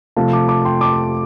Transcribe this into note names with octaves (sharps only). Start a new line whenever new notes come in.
C3 F3 A3 F5 A5
A5 D6
A5 D6
G5 C6
A5 D6